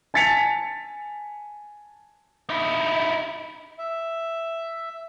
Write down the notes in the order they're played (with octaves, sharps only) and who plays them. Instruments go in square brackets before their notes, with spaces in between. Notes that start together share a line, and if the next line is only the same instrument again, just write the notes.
[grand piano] G#5 A5 A6 B6 C#7 F7
[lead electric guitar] D#4 E4
[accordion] E5